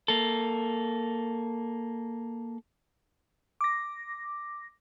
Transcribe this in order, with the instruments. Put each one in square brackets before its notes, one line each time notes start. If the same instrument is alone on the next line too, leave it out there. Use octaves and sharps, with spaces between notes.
[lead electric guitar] A#3 A4
[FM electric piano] D6 A#6